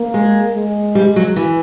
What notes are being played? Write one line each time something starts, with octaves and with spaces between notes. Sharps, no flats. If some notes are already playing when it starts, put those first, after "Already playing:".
Already playing: A#3
G#3
G#3
G3
F#3
E3